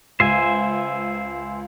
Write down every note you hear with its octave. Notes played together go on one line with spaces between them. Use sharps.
C#2 C5 E5 G#5